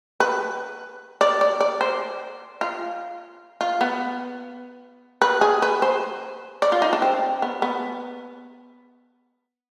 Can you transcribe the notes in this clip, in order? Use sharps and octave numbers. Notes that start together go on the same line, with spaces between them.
B4
D5
D5
D5
C5
F4
F4
B3
B4
G#4
B4
C5
D5
F4
D#4
D4
C4
B3
B3